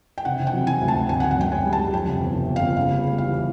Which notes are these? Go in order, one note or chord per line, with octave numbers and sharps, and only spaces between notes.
G5
C3 F#5
C3
G5
F#3
F#3 G#5
D2
A5
D2
G#1 G#5
F#5
G#1
F#5
F#2 G5
F#2 G#5
G3
A5
G3
F2 G5
C3
G1
C3
G1
F5
G1
C#3 F5
G3
G3
E2 F5
E3